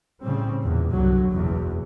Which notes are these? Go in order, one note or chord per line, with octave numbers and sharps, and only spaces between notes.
A2 C#3 G3 C4
E2 A#2
C2 G2 D3 F#3
F#1 B1 E2